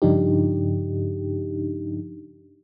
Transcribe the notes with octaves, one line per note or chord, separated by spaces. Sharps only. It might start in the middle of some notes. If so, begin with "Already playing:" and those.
G2 C#3 F3 D4 D#4 G4